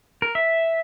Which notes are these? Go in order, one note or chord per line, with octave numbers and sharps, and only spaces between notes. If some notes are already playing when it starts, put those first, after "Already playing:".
A#4
E5